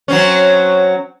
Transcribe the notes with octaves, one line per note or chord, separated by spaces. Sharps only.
F#3 C4 C#4